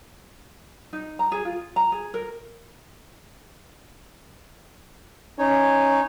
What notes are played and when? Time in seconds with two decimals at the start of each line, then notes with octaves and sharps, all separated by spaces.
0.93 D#4
1.19 A#5
1.32 G#4
1.45 F4
1.76 A#5
1.92 G#4
2.14 A#4
5.39 C#4 D#4 C#5